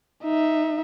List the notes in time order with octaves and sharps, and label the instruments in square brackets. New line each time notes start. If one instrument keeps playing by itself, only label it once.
[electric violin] D#4 E5